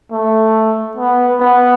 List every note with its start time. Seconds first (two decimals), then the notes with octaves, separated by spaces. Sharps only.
0.12 A3
0.97 B3
1.40 B3